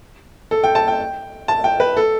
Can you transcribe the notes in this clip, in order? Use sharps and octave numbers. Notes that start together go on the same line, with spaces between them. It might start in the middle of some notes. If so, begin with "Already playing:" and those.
A4
G5
A5
G5
A5
G5
B4
A4